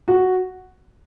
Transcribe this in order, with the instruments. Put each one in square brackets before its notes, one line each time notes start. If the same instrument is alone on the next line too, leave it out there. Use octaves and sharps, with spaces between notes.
[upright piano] F#4